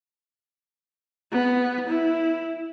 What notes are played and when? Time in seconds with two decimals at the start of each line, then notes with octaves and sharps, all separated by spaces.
1.32 B3
1.89 E4